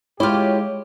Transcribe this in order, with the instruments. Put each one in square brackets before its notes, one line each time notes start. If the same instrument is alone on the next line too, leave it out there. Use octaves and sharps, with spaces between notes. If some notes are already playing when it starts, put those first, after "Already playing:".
[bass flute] G#3 [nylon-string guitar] E4 F4 [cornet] G4 [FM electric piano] C#5